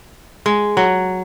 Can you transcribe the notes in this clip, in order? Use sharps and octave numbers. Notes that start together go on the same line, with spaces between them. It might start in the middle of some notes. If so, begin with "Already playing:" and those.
G#3
F#3